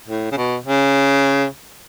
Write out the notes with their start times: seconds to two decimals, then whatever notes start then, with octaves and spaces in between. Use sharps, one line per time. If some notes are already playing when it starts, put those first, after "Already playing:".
0.08 A2
0.32 C#3
0.37 B2
0.66 C#3